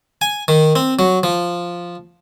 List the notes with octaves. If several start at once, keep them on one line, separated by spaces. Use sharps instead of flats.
G#5
D#3
C4
F#3
F3